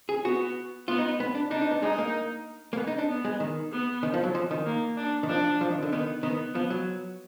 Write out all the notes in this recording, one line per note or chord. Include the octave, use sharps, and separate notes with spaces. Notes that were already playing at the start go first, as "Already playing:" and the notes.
G#4
B3 F#4
B3 F4
D#4
B3
D4
D4 D#4
D#4
B3
G#3 D#4
A#3
A#3
B3
D#4
D4
B3
G#3
D#3
B3
D#3
F3
F#3
F3
D#3
A#3
D4
D#3
F3 D4
F3
D#3
D3
D#3 B3
D#3 B3
F3 B3
F#3